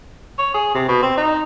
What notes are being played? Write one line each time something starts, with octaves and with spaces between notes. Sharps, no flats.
C#5
G#4
C3
B2
C4
D#4